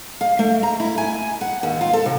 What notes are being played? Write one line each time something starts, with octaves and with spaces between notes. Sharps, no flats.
F5
A3
A#5
E4
G#5
F#5
D#2
F4
A4
C3